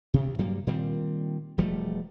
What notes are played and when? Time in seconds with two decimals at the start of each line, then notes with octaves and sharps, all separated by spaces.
0.14 D2 C3
0.38 G2 F#3 G3 A#3
0.67 A#2 D#3 G3 C4
1.58 E1 F3 G3 A3